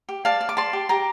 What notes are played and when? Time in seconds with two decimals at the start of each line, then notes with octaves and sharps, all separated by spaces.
0.09 G4
0.25 D5 F5 A5
0.41 D5
0.49 D6
0.57 D5 A5 C6
0.73 G4
0.89 G4 A#5 D6